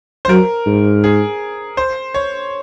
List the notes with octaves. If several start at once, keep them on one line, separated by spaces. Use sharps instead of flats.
C5
F#3 A#4
G#2
G#4
C5
C#5